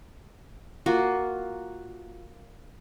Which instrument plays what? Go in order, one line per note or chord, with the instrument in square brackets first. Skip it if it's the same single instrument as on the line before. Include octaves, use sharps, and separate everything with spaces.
[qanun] A#3 F4 F#4